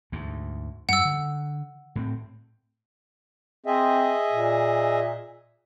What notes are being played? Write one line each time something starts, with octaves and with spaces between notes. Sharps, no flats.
D2 G#2
F#2 G3 F#5 E6
D3
A2 F3 C4
C4 G#4 D#5 E5
A#2